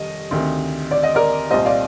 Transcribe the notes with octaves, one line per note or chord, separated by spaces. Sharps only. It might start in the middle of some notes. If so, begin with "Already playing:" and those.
Already playing: F1 D#3 G3 D#5
D2 C3 D#3
D5
D#5
A#4 D5
C2 A#2 G3 C5 D#5
D5 F5